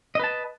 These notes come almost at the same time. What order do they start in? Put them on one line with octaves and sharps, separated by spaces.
D#5 B4 A5